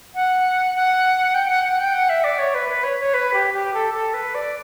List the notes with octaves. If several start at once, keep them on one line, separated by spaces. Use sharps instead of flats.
F#5
F#5
G5
F#5
F#5
G5
F#5
E5
D5
C#5
B4
B4
C#5
C#5
B4
G4
G4
A4
A4
B4
D5